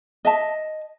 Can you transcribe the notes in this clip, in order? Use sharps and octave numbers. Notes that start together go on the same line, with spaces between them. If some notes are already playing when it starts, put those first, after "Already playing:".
D#5 E5 A5